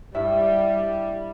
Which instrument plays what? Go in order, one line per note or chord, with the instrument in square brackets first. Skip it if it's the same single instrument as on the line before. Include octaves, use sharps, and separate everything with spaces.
[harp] G2 E4 E5 [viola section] G3